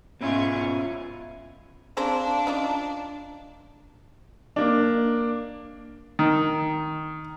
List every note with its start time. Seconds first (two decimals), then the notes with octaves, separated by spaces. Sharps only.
0.21 G#2 B2 C#4 E4 F4
1.97 C4 D4 G#4 C5 F5 A5 A#5
2.47 C#4 D#4 F4
4.56 A#3 D4
6.19 D#3